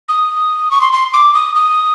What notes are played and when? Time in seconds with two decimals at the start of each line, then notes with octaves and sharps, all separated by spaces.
0.08 D#6
0.71 C#6
0.81 C6
0.92 C6
1.13 D6
1.34 D#6
1.55 D#6